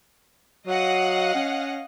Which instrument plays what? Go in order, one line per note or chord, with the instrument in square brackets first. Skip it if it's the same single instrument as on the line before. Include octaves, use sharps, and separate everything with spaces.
[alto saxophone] F#3 [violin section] D#5 F5 F#5
[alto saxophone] C#4